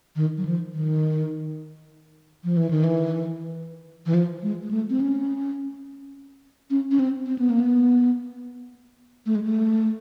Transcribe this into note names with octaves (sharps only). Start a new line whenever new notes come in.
D#3
F#3
F3
D#3
F3
E3
D#3
E3
E3
F3
G#3
G#3
A3
C4
C#4
C#4
C#4
C4
C4
B3
A#3
B3
A3
G#3
A3